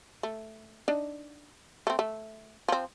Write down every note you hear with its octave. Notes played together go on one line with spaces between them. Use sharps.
A3
D4 D#4
A3 C4
A3
F3 C4